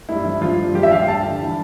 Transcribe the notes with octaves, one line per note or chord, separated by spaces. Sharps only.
G2 E4
F3
F3 F4
G2
F3 G4
E5
F3 F5
G5
G2 A5
D3
E3